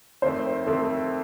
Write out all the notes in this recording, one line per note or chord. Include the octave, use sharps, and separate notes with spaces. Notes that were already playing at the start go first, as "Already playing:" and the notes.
F2 D#3 A3 C4 C5
F2 D#3 A3 C4 A4